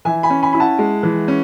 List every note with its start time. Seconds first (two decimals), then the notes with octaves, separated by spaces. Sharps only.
0.05 E3 E5 G#5
0.23 G#5 B5
0.30 C#4
0.43 G#5 B5
0.53 E4 B5
0.60 F#5 A5
0.79 G#3
1.03 E3
1.28 C#4